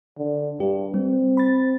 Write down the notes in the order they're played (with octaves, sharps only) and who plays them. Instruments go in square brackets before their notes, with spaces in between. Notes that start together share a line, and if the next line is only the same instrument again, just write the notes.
[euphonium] D3
[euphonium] G2 [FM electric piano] G4
[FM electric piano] G3 [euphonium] C4
[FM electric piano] B5 A6